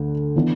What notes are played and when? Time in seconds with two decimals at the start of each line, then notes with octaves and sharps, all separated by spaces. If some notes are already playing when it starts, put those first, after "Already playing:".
Already playing: D2 D3
0.36 E3 B3 D4